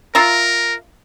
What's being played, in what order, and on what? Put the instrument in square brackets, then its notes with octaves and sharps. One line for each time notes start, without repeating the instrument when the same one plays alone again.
[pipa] F4 E5 A#5 [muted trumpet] A#4